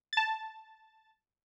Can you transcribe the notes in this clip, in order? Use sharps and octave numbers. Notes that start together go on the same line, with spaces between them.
A5 A6